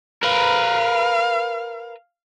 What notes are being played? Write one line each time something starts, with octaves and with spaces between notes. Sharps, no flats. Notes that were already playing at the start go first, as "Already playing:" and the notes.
A#4 B4 F5